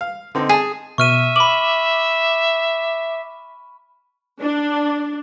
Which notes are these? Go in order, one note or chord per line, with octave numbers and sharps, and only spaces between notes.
F5
D3 C4 D#4
G#4 G#5 A5
B2 E5 C#6 F6 D#7
B5 D6 F#7
D4